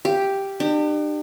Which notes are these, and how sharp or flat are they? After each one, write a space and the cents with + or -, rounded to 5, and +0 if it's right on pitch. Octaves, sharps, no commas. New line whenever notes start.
G4 +0 F5 -30
D4 +45 G4 +0